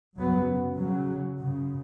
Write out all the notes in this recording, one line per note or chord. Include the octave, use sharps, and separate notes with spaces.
F#2 C#3 F#3 B3
C#3 F#3
F#2 C#3